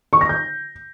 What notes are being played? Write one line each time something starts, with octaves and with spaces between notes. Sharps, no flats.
C#6
A#6
G6